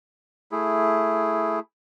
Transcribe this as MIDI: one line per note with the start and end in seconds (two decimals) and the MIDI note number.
0.52 1.60 57
0.52 1.60 64
0.52 1.60 68